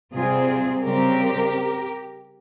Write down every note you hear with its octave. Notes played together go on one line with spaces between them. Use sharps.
C3 G3 C4 F4 G#4
C#3 G3 C4 G4 A#4